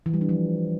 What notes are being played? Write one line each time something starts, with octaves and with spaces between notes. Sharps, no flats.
E3
G3
D4
F3